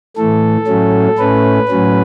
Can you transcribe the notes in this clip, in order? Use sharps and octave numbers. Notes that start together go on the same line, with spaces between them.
A2 E3 A3 A4
A2 F#3 A3 C#4
A2 A3 C#4 B4
A2 F#3 C#4